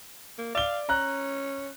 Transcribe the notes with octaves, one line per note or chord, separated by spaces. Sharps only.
A#3
D5 F5 G7
C#4 A#5 F#6